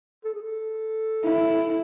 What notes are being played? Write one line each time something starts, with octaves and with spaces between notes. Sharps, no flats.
A4
G#4
A4
E4